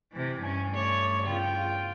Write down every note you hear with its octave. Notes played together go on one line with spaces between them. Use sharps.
C3 E3
G2 C#4 G#5
A3 C#5 D5
C#3 B3 F4 G5
F4